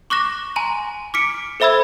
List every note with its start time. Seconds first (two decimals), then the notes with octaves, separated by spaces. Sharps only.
0.10 C#6 D6 F#6 A#6 E7
0.56 G#5 A#5 C6 D#7
1.14 D6 F6 B6 C#7 D7
1.60 A4 C5 E5 B5 E6 G#6